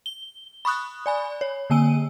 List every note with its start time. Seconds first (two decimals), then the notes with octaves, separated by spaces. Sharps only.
0.06 G7
0.65 B5 C#6 D#6 F#6
1.06 D5 G#5 B5
1.41 C#5
1.70 D3 A#3 G#5 E6 D#7